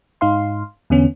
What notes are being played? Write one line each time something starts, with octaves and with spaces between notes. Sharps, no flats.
G#2 D#4 F5 C6
E2 D3 B3 C#4